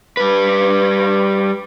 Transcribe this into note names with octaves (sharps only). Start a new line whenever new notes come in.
G3 B4